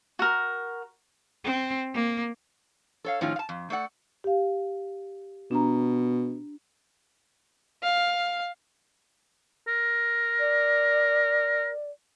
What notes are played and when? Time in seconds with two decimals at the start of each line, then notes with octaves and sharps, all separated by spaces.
0.19 F#4 A#4
1.44 C4
1.94 A#3
3.05 A4 C#5 F5
3.21 A2 D#3 F3 C#4 D#4 F4
3.36 F5 A5
3.49 F2
3.70 A3 A4 D5 F#5
4.24 G4 F5
5.51 B2 D4 A#5
7.83 F5
9.68 A#4
10.40 D5